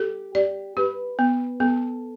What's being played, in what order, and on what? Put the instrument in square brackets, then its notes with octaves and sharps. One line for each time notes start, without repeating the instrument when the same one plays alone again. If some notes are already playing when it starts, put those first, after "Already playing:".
Already playing: [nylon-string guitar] G4 [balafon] A4
[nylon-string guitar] G4 [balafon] D5
[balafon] G4 [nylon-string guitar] B4
[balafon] B3
[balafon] B3 [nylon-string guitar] A4